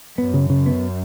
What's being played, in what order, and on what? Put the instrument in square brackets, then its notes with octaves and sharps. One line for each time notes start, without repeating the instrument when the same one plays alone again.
[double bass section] F#2 [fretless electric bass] B3
[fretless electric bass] C#3
C#3
B3